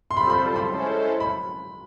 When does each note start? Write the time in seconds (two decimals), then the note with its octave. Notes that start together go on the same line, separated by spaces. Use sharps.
0.11 C6
0.16 G3 C4 F4 A4 C5 B5
0.30 B5
0.56 B5
0.68 G#3 C#4 E4 A4 C5
1.20 B5